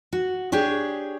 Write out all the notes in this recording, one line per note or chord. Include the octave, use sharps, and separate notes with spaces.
F#4
D4 G4 G#4 C#5